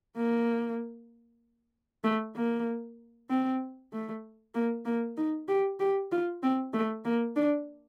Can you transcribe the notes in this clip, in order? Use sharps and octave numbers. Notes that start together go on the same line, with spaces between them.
A#3
A3
A#3
C4
A3
A#3
A#3
D#4
G4
G4
F4
C4
A3
A#3
D4